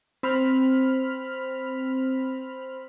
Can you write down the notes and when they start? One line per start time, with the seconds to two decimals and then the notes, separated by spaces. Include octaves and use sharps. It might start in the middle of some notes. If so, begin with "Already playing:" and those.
0.23 C4 B5 F6